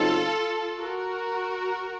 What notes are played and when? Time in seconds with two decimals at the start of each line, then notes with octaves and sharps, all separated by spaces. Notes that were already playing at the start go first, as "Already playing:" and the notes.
Already playing: C#3 F#3 C4 D#4 F4 A4
0.79 F#4 A#4